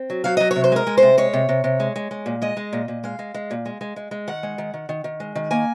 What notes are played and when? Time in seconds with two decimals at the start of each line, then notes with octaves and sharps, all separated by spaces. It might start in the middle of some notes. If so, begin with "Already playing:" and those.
Already playing: C4
0.10 F#3
0.24 F#3 F5
0.37 F#3 D#5
0.51 C#5
0.56 C3
0.64 C5
0.72 G#3 A#4
0.87 G#3
0.97 C3 C5
1.18 G#3 C#5
1.33 C3
1.49 C3
1.64 C3
1.80 G#3
1.96 G#3
2.11 G#3
2.26 A#2
2.42 G#3 D#5
2.57 G#3
2.73 A#2
2.88 A#2
3.04 G#3 F5
3.19 G#3
3.34 G#3
3.51 A#2
3.66 G#3
3.81 G#3
3.96 G#3
4.11 G#3
4.27 D#3 F#5
4.43 G#3
4.58 D#3
4.74 D#3
4.89 D#3
5.04 D#3
5.20 G#3
5.35 D#3
5.51 A#3 G#5